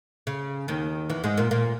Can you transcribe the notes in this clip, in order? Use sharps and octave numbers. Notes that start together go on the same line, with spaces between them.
C#3
D#2 D#3
E2 E3
G#2 G#3
A#2 A#3
A#2 A#3